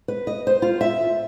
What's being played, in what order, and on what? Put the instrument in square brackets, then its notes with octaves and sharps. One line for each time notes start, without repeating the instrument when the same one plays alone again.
[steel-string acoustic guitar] B4
D#5
C5
F4
E5